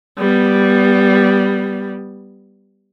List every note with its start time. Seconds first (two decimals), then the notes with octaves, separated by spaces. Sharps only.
0.18 G3 B3